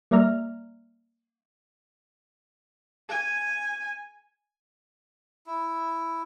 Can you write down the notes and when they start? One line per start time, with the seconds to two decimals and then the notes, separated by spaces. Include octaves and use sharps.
0.11 G3 A#3 D5 E5 A#5 F6
3.09 G#5
5.46 E4